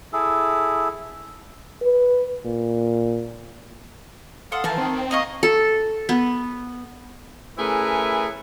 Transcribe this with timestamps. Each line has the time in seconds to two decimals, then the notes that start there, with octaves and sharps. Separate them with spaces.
0.13 E4 G#4 A4
1.82 B4
2.45 A#2
4.52 A4 F5 F#5 C6 D#6
4.64 E3 A#3 C5 A5
4.78 D#3 C4
5.11 A#3 D#5 F5 C#6
5.43 A4
6.09 B3
7.57 A3 C#4 E4 G#4 A#4 B4